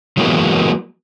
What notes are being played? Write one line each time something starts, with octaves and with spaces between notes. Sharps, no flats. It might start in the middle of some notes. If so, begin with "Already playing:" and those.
E3 F#3 G#3 A#3 B3